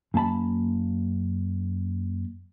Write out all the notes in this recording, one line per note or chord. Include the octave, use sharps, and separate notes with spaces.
F#2 A#3 A5 B5